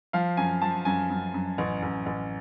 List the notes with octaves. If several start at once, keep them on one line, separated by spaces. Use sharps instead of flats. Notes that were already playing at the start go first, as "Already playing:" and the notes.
F3 F5
F#2 G#5
F3 A5
F#2 G#5
F#2
F#2
A1
A1
A1